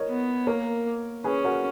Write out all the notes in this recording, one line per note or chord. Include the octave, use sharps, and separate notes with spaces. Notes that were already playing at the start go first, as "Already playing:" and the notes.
Already playing: A#4 C#5 D#5
B3
A#3 A#4 C#5
C#4 G#4 B4
F#4 A#4